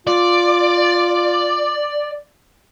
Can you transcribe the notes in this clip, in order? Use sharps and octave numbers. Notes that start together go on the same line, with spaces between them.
F4 D5